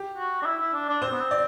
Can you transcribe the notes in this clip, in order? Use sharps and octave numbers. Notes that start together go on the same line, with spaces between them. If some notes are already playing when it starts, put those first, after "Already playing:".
Already playing: G4
F#4
D4
E4
E4
D4
D4
C4 C5
B3
C4
D5